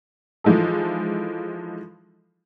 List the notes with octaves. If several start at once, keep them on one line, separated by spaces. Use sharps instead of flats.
E3 F3 G#3 D#4 A4